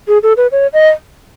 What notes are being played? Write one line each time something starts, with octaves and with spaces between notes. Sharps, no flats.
G#4
A4
B4
C#5
D#5